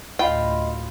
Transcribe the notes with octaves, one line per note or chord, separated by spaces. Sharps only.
D2 A2 F4 D#5 F5 G5 B5 C6